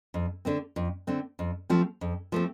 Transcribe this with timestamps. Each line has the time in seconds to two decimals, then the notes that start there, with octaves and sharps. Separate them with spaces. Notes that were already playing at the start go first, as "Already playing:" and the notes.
0.14 F2
0.45 D3 A3 C4
0.76 F2
1.07 D3 A3 C4
1.39 F2
1.70 F3 A3 C4
2.01 F2
2.32 F3 A3 C4